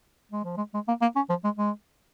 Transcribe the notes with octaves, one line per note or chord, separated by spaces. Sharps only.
G#3
F3
G#3
G#3
A#3
A#3
C#4
F3
G#3
G#3